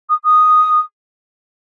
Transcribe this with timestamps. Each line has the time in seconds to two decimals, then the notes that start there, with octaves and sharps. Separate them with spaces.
0.09 D#6
0.24 D#6